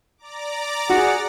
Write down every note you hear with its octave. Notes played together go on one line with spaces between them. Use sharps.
D5 A#5 D6
F#4 G#4 F#5